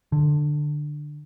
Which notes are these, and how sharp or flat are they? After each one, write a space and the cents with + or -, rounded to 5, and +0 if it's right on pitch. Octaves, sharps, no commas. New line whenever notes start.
D3 +15